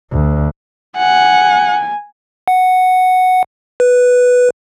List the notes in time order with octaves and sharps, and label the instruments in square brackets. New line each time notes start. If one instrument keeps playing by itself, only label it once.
[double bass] D2
[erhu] F#5 [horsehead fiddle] G#5
[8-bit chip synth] F#5
B4